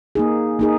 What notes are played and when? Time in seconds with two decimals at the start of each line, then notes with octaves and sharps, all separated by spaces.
0.15 A#3 D#4 G#4
0.59 A#3 D#4 G#4